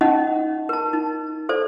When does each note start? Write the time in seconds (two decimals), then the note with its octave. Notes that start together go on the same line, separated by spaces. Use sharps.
0.01 C#4 D#4 D#5 F#5
0.69 A#4 A5
0.93 D#4
1.49 A4 C5 D5